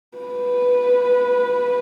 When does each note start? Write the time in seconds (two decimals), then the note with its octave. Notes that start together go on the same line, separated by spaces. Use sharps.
0.17 B4